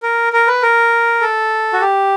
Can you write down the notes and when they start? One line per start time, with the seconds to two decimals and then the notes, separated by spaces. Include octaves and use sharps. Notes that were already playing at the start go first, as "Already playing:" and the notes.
0.03 A#4
0.33 A#4
0.47 B4
0.62 A#4
1.21 A4
1.73 F#4
1.81 G4